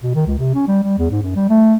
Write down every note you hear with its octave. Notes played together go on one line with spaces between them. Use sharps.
B2
D#3
C#2
C3
C#4
G3
G3
E2
G#2
F#2
G3
A3